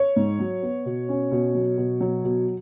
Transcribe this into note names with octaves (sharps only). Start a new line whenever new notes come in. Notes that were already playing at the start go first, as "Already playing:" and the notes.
Already playing: C#5
G#2
F#3
B3
B2
C#4
B2
F#3
B2
F#3
B2